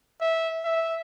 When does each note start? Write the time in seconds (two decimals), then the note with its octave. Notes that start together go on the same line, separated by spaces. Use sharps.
0.21 E5
0.65 E5